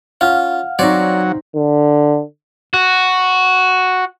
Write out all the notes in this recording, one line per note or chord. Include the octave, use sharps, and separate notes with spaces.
C#4 F4 F5 F#5 F6
F#3 C4 D#4 C#5 D5
D3
F#4